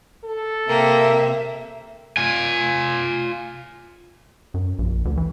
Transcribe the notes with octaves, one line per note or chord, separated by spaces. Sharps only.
A4
C3 A#3 A#4 E5 G5
F4 G#5
F#2
A#1
D2
E3